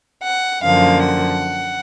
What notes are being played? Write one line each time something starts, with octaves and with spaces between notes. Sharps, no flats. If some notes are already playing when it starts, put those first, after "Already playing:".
F#5
F#2 D3 F3 A#3 F5
F#5